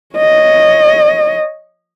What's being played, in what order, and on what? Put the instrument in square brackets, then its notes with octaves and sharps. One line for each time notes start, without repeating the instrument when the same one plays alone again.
[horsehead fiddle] C#5 D#5